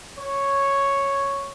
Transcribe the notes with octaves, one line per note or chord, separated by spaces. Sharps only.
C#5